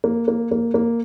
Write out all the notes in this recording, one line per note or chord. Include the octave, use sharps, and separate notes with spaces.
A#3
A#3
A#3
A#3